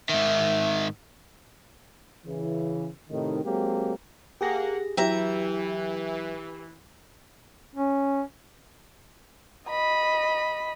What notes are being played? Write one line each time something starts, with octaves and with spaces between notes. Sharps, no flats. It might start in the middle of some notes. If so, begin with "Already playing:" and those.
G#2 D#3 E5
C#3 E3
A2 C3 D#3
F#3 G#3 A#3 C4 G4
A#3 G4 G#4 F#5 A#6
E3 F#3 E4 G4 E5 A#5
C#4
D#5 B5